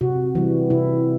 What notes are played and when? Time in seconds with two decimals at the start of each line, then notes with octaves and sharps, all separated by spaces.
0.01 C3 F#4
0.35 E3 G3
0.70 C3 E4